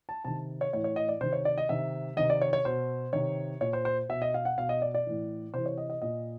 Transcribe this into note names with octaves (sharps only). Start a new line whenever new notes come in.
A5
C3 D#3 A5
C#5
A2 E3 C#5
C#5
D#5
D5
C3 D#3 C5
C#5
D5
D#5
C3 D#3 E5
C3 D#3 D#5
D5
C#5
C#5
B2 C5
C3 D#3 C#5
A#2 C#5
C5
C5
B2 E5
D#5
F5
F#5
B2 F5
D#5
D5
D5
A2 E3
C3 E3 C5
C#5
D#5
D#5
A#2 D#5